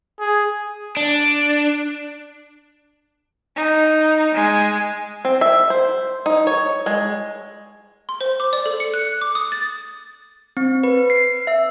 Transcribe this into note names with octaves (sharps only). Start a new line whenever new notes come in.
G#4
D4
D#4
G#3
C4
E5
C5
D#4
C#5
G#3
C6
C5
D6
D5
A4
C#7
F#6
D6
D#6
A6
C4
B4
C7
E5